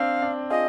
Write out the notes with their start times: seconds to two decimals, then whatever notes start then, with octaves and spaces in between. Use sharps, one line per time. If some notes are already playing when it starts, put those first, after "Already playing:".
Already playing: C4 D4 F5
0.22 D4
0.50 F4 G#4 D#5